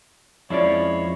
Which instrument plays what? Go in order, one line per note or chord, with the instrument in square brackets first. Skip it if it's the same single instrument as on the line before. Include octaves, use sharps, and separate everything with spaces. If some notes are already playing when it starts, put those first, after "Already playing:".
[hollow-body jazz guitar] F2 C#4 D5 [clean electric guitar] F3 G#3 E4 [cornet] C#5